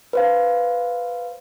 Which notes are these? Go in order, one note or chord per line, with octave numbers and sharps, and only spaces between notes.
B4 C5 F5